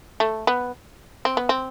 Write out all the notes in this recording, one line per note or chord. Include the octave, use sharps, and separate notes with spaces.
A3
B3
C4
B3
C4